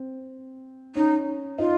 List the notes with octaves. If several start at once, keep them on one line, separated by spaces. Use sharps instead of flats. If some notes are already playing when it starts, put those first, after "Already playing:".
Already playing: C4
C#4 D#4
D#4 F4